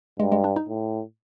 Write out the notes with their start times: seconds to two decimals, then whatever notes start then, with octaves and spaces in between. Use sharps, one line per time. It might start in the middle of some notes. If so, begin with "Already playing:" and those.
0.20 G2 G#3
0.32 G#3
0.44 D4
0.56 D#4
0.68 A2